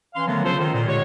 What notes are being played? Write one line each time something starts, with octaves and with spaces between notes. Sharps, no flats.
E3 C#4 F5 C6
D3 D#3 F3 F#3 A3 B3
C#3 C#4 F4 A4 C5
D#3
A#2
D3 G#3 G4 C#5